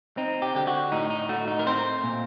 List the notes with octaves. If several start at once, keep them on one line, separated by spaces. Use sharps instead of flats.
C4 D#4
G4
D3 G4
F#4
A2 D#4
D#4
A3 F#4
D#4
A#4
C4 C5
A#2